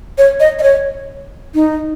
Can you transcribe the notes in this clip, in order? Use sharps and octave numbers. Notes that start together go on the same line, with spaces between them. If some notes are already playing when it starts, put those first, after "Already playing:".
C#5
D#5
D#5
C#5
D#4